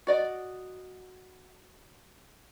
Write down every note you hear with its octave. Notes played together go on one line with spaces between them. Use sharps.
F#4 D5 D#5